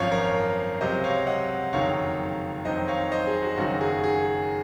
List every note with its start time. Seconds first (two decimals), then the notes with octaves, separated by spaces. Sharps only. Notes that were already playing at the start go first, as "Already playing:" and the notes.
Already playing: G#1 F#2 F3 C#5 F5
0.11 A#4 C#5
0.81 C#2 C3 F#3 C5 D#5
1.04 C#5 F5
1.27 D#5 F#5
1.73 F#1 F2 D#3 F#3 C#5 F5
2.65 F2 D#3 F#3 C5 D#5
2.88 C#5 F5
3.12 C5 D#5
3.27 G#4
3.42 F#4
3.58 F#1 F#2 D#3 F#3 F#4
3.81 G#4
4.04 G#4